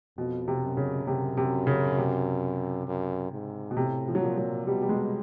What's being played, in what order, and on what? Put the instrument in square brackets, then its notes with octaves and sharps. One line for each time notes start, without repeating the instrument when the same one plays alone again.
[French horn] F2 [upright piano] B2
[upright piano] C3
[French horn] F#2
[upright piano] C#3
[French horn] F#2 [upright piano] C3
[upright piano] C3
C#3
C3
[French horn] F#2
G#2
[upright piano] B2
[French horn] A2 [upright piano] C3
[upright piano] F3
F#3
[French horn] A#2 [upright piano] F3
[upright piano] F#3
[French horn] B2 [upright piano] G3
[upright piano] G3
G#3